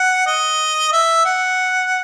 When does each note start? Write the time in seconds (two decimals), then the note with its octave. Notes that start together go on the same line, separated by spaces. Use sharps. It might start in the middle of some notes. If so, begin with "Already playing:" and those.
Already playing: F#5
0.27 D#5
0.92 E5
1.25 F#5